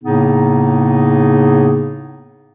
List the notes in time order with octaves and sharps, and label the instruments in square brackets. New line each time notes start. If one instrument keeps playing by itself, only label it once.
[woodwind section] A2 C#3 A#3 B3 D#4 G#4